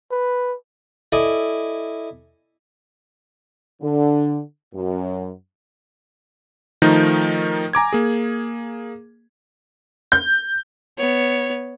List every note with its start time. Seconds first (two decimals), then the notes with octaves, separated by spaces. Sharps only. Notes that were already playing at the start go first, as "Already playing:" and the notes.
0.11 B4
1.12 E4 A4 D5 D#5 G#5
3.82 D3
4.74 F#2
6.82 D#3 F3 A3 D#4 A#4 G6
7.73 G#5 A#5 D6 G#6
7.93 A#3 G#4
10.12 G6
10.98 B3 C#5